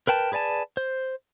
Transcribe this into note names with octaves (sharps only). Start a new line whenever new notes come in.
A#4 B4 G5 A5
G#4 B4 D5 G#5 A5
C5